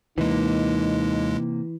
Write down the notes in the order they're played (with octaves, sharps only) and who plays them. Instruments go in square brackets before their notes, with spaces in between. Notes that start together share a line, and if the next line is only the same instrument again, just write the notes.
[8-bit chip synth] D#2 G#3 [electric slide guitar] C3 A#3 [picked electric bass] E3 [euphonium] D#4